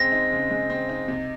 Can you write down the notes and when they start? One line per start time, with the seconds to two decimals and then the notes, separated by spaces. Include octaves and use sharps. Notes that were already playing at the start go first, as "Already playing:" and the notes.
Already playing: C#3 G#3 C4 A#6
0.12 D#4
0.32 C#3
0.51 G#3
0.70 C4
0.89 D#4
1.08 C3